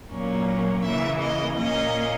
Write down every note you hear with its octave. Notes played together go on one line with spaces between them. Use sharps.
A#2 F#3 A#3 C#4
C#3 E3 A#3 E5
D#5
A#2 A#3 C#4 D#5